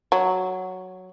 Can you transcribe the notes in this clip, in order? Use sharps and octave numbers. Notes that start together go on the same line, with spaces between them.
F#3